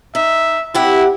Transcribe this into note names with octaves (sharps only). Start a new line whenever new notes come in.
D#4 E5
C3 E4 G4 F#5